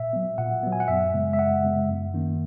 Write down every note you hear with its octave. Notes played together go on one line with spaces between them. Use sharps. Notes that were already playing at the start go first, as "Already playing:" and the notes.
Already playing: A#2 E5
F#3 B3
A#2 F#5
F#3 B3
G#5
F#5
F#2 E5
C#3 G#3 B3
E5
F#2 F#5
C#3 G#3 B3
F#2
D#3 A#3 C#4